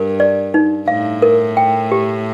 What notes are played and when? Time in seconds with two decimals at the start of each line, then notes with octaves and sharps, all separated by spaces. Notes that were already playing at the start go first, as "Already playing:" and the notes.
Already playing: G2 A#4
0.20 D5
0.54 D#4
0.88 A2 F5
1.22 A#4
1.57 G5
1.92 G4